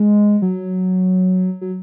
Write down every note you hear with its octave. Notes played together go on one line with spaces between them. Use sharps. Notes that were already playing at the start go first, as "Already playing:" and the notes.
Already playing: G#3
F#3
F#3